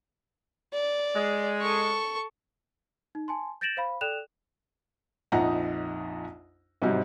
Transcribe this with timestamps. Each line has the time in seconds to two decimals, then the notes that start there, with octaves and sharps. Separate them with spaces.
0.74 D5
1.15 G#3
1.62 A4 C#6
3.15 D#4
3.28 G#5 A5 C6
3.61 G6 A6 A#6 D7 E7 F#7
3.77 C5 F5 B5
4.01 A4 D5 G5 F#6 E7 F7
5.32 A#1 F2 D#4 F#5 A#5
6.82 G#2 C3 F#3 G3